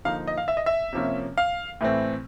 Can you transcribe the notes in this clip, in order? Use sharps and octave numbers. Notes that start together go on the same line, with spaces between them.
D3 F3 A#3 D#4 F5
D#5
F5
E5
D#5
E5
C3 F3 A#3 C#4
F5
A2 E3 A3 C4